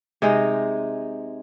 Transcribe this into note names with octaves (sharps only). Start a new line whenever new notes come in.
C3 G#3 D#4